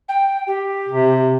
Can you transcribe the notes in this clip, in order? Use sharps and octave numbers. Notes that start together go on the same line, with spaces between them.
G5
G4
C3